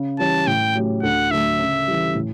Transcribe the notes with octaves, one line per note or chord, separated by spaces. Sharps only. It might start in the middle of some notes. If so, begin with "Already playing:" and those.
Already playing: C#3
E3 G3 C#4 A5
A2 G5
F#3 A3 C#4 G4
D2 F#5
D3 F#3 A3 E5
C#3
E3 G3
A2